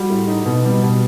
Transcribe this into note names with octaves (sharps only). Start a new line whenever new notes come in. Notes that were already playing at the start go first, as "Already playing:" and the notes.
Already playing: G3 F#4
A2
D#4
B2
G3
B2